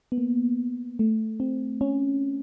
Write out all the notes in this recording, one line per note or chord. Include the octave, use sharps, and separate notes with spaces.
B3
A#3
A3
C4
C#4